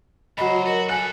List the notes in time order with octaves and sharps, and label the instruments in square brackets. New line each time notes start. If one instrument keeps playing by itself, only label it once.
[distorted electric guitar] C#2 C5 [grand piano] F#3 B5 [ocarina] D#5
[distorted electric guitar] F#4 [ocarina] A#4
[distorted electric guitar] G4 A4 [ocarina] G#5 [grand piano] F#6